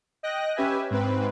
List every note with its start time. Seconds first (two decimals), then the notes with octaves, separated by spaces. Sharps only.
0.23 D#5 G5 F#6 A#6
0.56 C#4 G4 B4 E5 G#5
0.91 G#2 C4 B4